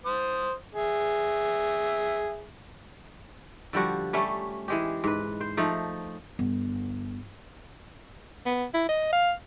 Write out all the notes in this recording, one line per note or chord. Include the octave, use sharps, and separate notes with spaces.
C5 D#6
G#4 E5
D3 F3 G3 F#4
G3 A3 C#4
E3 G#3 G4
G#2 B4
C5
F3 A3 D#4
G1
B3
E4
D#5
F5